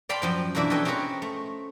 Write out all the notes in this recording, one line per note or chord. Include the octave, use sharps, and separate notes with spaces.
D5 F5 G5 A5 B5 C6
F#2 F3 G5
B2 E3 A#3 D4 E5
A4 B4 C#5 D#5 G5 G#5
C4 C#4 F4 G#4 A#4 B4
A3